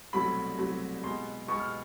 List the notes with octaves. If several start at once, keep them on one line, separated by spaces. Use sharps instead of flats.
C2 B2 F#3 A3 C4 B5
C2 B2 F#3 A3 C4
B2 G#3 B3 C6
B2 G#3 B3 C#6
F6